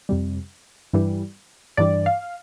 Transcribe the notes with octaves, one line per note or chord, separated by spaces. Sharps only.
F2 C3 G3
G2 E3 G3
G2 E3 G3 D5
F5